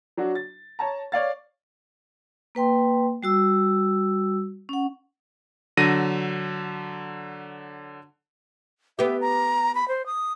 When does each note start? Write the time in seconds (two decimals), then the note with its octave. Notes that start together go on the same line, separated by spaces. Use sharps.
0.17 F#3 D4 F#4
0.35 A6
0.79 C#5 A5 A#5
1.12 C#5 D5 F5 A6
2.55 A#3 B4 G5 C6
3.23 G3 F#4 E6
4.69 C#4 F#5
5.77 D3 F#3 A#6 D#7
8.99 B3 G4 E5
9.21 A#5
9.75 B5
9.88 C5
10.06 D#6